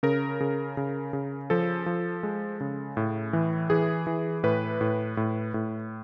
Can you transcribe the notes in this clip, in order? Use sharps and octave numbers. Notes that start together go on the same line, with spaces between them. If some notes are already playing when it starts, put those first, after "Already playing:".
C#3 A#4
C#3
C#3
C#3
F3 A4
F3
G#3
C#3
A2
E3
E3 G#4
E3
A2 B4
A2
A2
A2